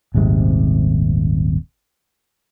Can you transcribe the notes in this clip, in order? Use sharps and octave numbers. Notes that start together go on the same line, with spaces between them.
D#1 G#1 G#2 C3